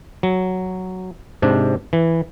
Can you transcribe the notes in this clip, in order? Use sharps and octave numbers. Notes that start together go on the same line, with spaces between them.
F#3
G#2 C3 D4
E3